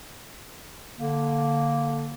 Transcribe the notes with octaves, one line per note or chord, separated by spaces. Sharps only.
D3 A#3